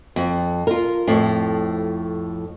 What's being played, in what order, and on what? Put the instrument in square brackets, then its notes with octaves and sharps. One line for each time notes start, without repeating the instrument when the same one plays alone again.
[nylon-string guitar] F2
F4 A#4
F2 A2